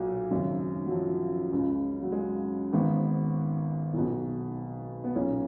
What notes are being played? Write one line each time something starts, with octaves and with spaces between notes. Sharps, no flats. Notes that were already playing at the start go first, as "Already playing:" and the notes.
Already playing: B1 A#2 F#3
G#1 F#2 C#3
F#3
F3
C#2 C#3
F#3
G#3
G#1 G#2 D#3 B3
B1 B2
B3
B1 A#2 C#4